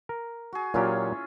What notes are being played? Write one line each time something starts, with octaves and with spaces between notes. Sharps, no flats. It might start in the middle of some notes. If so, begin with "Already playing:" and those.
A#4
F#4 G#4
A#2 F#3 C#4 E4 F4 G4